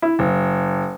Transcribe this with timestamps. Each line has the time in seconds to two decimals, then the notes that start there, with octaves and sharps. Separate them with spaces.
0.02 E4
0.19 F#1